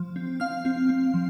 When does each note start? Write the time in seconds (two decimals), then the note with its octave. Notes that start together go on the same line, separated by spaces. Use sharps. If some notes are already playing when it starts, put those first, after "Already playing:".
Already playing: F3
0.16 C4
0.40 C4 F5 F6
0.65 C4
0.89 C4
1.14 F3